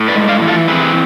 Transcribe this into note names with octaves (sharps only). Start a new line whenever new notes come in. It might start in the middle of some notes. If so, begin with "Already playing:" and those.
Already playing: A2
B4 D5
G#3
D5 F5
E3
F4 A4
C4 G#4 B4